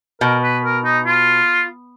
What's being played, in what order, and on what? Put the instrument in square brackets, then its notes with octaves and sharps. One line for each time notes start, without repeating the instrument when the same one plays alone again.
[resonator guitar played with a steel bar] B2 [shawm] A#4
[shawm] B4
A#4
D#4
F4